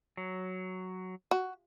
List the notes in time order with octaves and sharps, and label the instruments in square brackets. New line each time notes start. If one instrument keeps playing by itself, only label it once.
[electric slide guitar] F#3
[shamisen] F#4